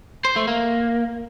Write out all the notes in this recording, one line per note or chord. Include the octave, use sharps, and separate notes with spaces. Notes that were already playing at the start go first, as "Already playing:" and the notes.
C5
A3
A#3